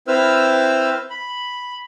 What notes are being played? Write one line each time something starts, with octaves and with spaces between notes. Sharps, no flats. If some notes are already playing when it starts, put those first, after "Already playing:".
C4 E4 B4 C5 E6 F6
B5